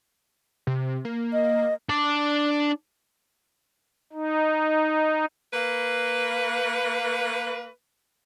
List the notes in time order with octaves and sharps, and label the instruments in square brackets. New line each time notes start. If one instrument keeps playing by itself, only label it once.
[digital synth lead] C3
A#3
[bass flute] D#5
[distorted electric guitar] D4 D5
[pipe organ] D#4
[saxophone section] A#3 B4